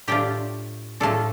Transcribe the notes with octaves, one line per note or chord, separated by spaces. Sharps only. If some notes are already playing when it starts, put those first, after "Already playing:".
A2 A3 D4 F4 G4 G5
A2 A3 D4 F4 A4 A5